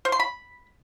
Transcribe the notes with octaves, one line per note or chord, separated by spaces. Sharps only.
C5
C6
B5